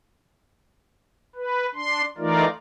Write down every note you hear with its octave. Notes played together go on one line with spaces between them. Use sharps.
B4
D4 C6
E3 A3 D#4 F4 A#4 D5